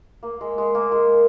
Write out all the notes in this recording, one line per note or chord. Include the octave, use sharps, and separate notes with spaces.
A#3
G#3
G#3
A#3
G#3